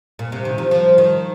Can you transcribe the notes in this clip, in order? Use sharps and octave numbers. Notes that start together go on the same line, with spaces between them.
A#2
C3
D#3
F3
F3
D#3